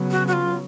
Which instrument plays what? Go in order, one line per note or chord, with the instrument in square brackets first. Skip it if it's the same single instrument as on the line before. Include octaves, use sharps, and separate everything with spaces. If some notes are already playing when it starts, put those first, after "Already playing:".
Already playing: [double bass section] C#3 F#3 B3
[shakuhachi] F#4
F#4
F4